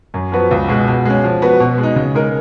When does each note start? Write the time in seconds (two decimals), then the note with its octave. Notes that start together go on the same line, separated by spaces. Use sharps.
0.14 F#2
0.32 F3 B3 F#4 B4
0.51 C#2
0.68 B2 G#3
0.88 B2
1.05 G#3 C#4
1.24 F3
1.42 B3 F#4 B4
1.60 B2
1.78 G#3
1.83 D#4
1.96 C#3
2.15 G#3 D#4 A#4